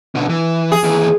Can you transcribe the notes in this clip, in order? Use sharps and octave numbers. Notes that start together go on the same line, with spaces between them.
B2 D3
E3
G#4
D#2 E3